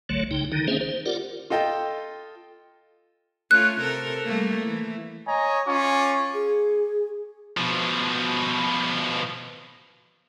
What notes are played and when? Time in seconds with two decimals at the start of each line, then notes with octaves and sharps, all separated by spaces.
0.09 F#1 C2 D3 F#3 A3 C#5
0.31 C2 C#3 D#4 G5
0.52 D3 D#3 D#4
0.68 A#3 C4 C#4 G#4 C5 E5
0.81 C5
1.06 F4 G4 A#4 D5 F#5
1.50 F4 A4 D#5 G5
3.51 A3 C#4 F4 F#6
3.80 C3 A4 A#4
4.24 G3 A3 A#3
4.65 E3
5.26 C#5 D#5 G#5 A#5
5.66 C#4 F4 C#6 D6
6.34 G#4
7.57 B2 F3